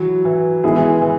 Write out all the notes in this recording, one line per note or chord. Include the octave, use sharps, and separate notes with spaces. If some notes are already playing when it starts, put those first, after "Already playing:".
Already playing: E3 F#3
E3
E3 G#3 B3 E4 G#4
E3
E3